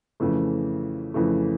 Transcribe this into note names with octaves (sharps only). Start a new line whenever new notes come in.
F2 C#3 E3 A3
F2 C#3 E3 A3